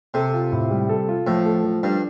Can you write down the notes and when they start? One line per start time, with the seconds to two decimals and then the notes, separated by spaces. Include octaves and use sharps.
0.14 C3 A4
0.33 F4
0.52 A2
0.71 G3
0.89 A4
1.09 F4
1.27 A2 F3
1.46 A4
1.64 F3
1.83 G2 D4